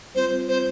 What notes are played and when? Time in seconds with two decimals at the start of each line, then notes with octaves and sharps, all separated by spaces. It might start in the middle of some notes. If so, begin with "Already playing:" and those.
0.14 G3 C4 F4 C5
0.48 C5